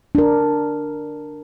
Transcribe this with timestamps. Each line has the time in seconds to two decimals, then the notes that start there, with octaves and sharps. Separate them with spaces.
0.15 D4 A#4